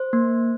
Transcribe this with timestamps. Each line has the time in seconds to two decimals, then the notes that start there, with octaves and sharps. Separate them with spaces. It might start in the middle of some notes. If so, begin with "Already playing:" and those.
Already playing: C5
0.13 A#3